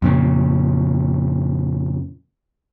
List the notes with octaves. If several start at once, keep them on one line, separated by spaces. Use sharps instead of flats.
F2 A#2 C#3